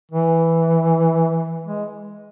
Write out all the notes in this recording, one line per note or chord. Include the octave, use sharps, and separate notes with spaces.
E3
G#3